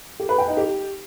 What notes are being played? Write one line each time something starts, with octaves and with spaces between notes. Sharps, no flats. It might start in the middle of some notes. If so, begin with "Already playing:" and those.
G4
B4
G5
D#4
G4